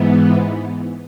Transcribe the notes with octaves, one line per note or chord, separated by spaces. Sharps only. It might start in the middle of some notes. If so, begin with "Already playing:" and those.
Already playing: G#2 E3 B3